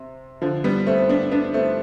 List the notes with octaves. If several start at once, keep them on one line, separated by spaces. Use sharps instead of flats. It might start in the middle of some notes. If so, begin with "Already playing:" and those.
Already playing: C3
D3 F3
G3 B3
A3 C4
C4
B3 D4
B3 D4
A3 C4